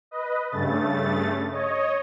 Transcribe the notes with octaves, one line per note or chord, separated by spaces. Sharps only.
B4 D#5
G2 C#3 A3 A6
C#5 D#5